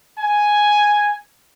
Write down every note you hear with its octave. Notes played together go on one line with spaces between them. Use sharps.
G#5